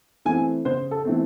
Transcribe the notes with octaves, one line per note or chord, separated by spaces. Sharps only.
E3 A3 C4 G#5
C#3 C5
A4
E3 A3 C4